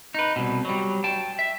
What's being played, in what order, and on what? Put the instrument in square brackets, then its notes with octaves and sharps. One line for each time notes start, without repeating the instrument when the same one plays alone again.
[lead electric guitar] D#4 B4
C2 B2
F#3 G3
G5 A5
E5